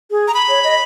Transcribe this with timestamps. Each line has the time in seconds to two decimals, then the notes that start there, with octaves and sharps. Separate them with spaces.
0.11 G#4
0.28 A#5
0.34 B5
0.49 C#5
0.64 D#5